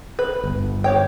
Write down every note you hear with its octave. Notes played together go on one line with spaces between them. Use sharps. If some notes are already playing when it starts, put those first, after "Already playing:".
B4
G1
G4 C#5 G5